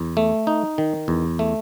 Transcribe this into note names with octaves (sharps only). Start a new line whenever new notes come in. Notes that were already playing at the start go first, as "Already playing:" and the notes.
Already playing: E2
A3
D#4
D#3
E2
A3